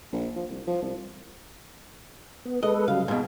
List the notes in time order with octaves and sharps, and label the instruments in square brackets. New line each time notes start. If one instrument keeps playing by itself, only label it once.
[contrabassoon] A#1
F3
C2
F3
C2
[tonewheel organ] B3
[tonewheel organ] G#3 A4 B4 [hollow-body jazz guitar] D#5
[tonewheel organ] C#3 F#3 G3 [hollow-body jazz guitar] F5
[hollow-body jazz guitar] G#2 B2 [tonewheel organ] G#3